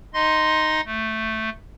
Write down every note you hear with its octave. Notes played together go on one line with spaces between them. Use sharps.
D#4 D#5 C6
A3